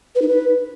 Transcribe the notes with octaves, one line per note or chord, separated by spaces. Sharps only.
B4
D#4
B4